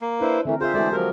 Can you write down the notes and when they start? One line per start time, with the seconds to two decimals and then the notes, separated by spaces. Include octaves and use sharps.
0.01 A#3
0.21 D4 E4 B4 C5
0.45 D3 E3 A3 C4 A#4
0.61 F4 G#4 A#4 C5 E5
0.74 E3 G#3 A3 F#4 A4 D5
0.92 F3 F#3 G4 A#4